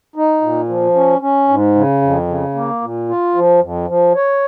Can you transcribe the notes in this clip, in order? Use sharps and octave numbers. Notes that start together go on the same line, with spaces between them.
D#4
A#2
F3
C#4
C#4
G#2
C#3
F2
C#3
A#3
A#2
F4
F3
F2
F3
C#5